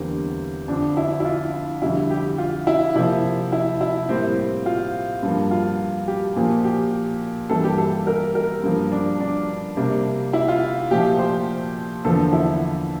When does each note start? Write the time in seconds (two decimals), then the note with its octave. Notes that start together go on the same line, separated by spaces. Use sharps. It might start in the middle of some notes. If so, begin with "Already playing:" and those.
Already playing: E2 D3 G3 A#3 C4
0.68 F2 D3 F3 D4
0.97 E4
1.20 E4
1.25 F4
1.82 F2 D3 G3 E4
2.10 G4
2.38 F4
2.67 E4
2.95 C3 F3 A#3 E4
3.52 E4
3.81 E4
4.09 A2 G3 A#3 C4
4.66 F4
5.23 G2 F3 A#3
5.51 F4
6.08 G4
6.36 A#2 F3 A#3
6.64 G4
7.49 G2 E3 G3 A#3 A4
7.64 G4
7.78 A4
8.07 A#4
8.35 A#4
8.63 G2 F3 A#3
8.92 D4
9.20 D4
9.77 C3 G3 A#3 D4
10.33 E4
10.48 F4
10.91 A#2 F3 A3 G4
11.19 C5
12.05 E2 D3 F3 A#3 A4
12.32 E4